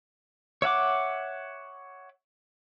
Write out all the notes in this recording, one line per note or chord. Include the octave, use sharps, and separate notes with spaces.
C#5 E5 F#5 D6